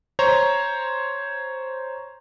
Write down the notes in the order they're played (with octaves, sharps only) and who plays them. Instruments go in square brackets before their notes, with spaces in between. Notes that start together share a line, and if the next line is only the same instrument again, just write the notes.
[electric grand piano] C5 C#5 A#5